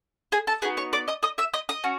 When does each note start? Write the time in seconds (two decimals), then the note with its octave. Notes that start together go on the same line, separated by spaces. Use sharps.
0.32 G#4 G#5
0.47 A4 A5
0.62 B3 D#4 F#4 G#4 G#5
0.77 C#5 C#6
0.93 D5 D6
1.08 D#5 D#6
1.23 D#5 D#6
1.38 E5 E6
1.54 D#5 D#6
1.69 D#5 D#6
1.84 C#4 F#4